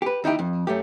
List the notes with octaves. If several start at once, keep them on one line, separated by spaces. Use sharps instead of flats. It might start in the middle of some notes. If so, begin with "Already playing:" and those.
G4 B4
D#2 D#4 E4 G4
F2
F#2 A3 G4